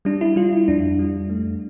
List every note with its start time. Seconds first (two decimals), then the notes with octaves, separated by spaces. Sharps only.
0.05 G3 D4
0.21 E4
0.36 G3 F4
0.53 E4
0.68 F2 D4
0.99 G3
1.30 A3